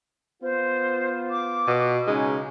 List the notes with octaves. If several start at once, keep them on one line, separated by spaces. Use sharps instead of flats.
B3 F4 C5
D6
B2
C#3 G#3 C#4 D#4